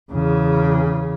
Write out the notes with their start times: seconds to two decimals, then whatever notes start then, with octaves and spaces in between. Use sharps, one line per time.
0.12 E2 C#3